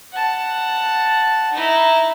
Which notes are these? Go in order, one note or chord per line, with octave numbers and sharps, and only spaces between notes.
F#5 A5
D#4 E4